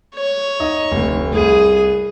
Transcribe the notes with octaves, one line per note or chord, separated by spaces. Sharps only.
C#5
D#4 D#5
F1 D2
C2 G#4 D#7